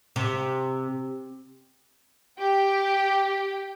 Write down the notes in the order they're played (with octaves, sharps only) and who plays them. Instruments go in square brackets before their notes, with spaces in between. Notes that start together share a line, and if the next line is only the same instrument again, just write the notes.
[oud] C3
[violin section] G4 G5